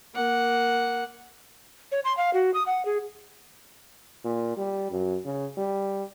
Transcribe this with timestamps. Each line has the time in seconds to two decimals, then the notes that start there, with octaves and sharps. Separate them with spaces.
0.15 A#3 F#5
1.92 C#5
2.05 C6
2.17 F5
2.34 F#4
2.54 D#6
2.66 F#5
2.85 G#4
4.24 A#2
4.57 G3
4.91 F#2
5.25 C#3
5.57 G3